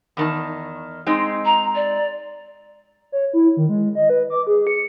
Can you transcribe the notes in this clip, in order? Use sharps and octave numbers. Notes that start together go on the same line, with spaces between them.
E2 D#3 A5
G#3 C4 D#4
A#5
D5
C#5
E4
D#3
G#3
D#5
B4
D6
G#4
C#7